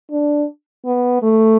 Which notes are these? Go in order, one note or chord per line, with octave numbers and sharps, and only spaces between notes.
D4
B3
A3